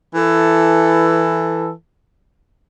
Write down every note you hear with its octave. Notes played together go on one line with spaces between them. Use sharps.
E3 A4